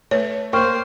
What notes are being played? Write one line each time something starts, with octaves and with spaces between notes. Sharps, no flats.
A3 B4 C#5
A#3 C5 G5 C#6 F6